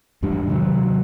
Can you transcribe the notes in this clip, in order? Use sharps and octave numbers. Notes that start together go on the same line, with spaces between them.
E2 G#2 G3 D4
C3 D#3 F#3